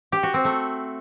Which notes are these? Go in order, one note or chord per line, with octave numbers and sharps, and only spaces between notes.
G4
F#4
C4
A3